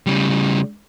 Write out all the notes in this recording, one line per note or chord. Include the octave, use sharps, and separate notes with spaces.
C#3 G3